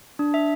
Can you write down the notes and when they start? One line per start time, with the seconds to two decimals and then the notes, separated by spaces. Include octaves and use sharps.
0.19 D4
0.34 E5